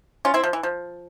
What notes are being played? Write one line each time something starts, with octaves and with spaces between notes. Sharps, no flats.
C#4 F4
C4 E4
F3
E3
F3